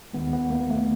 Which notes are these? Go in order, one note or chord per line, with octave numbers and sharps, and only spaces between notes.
D#2 D#3 G#3 B3
B3
A#3
A3